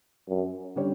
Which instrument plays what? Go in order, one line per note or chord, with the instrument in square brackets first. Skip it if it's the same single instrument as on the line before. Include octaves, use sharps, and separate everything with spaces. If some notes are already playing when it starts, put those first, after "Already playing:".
[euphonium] F#2
[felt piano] D3 G3 C#4 G4 C#5